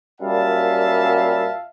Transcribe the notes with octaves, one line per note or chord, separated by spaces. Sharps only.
F#2 A#2 G3 E5 F5 A5